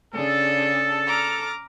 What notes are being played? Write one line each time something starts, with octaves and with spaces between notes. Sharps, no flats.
C#3 D4 G#4 A4
A#5 D6 F6